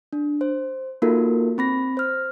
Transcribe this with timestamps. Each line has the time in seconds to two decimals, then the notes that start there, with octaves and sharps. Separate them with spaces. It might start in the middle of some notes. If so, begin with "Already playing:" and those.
0.13 D4
0.41 C5
1.02 A#3 D#4 F4 F#4 A4 A#4
1.58 C4 B5 A#6
1.97 C5 F6